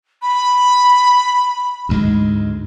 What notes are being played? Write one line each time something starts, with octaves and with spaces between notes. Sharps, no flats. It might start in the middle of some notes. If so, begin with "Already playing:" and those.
B5
D2 G#2 G#3